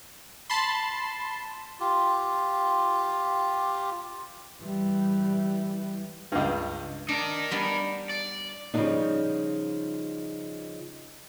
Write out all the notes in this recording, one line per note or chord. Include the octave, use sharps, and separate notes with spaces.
A5 B5 C6
F4 G4
E3 G3
C#2 G2
D4 D#4 A#4
G3 B3 D4
D5
C#3 F3 G3 G#3 D4 D#4